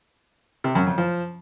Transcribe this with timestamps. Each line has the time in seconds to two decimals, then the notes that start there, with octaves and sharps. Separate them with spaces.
0.64 C3
0.75 F#2
0.87 F2
0.98 F3